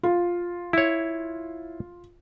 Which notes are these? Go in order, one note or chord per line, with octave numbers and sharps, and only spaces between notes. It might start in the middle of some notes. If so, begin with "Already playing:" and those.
F4
E4 C#5